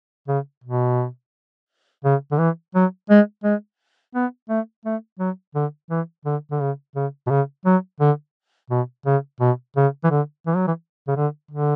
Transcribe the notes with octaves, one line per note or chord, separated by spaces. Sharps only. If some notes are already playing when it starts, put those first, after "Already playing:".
C#3
B2
C#3
D3
E3
F#3
G#3
G#3
B3
A3
A3
F#3
D3
E3
D3
D3
C#3
C#3
B2
C#3
F#3
D3
B2
C#3
B2
C#3
E3
D3
E3
F#3
E3
C#3
D3
D3